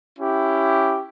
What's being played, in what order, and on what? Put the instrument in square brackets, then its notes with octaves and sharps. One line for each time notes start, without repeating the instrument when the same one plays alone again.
[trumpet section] C#4 E4 G4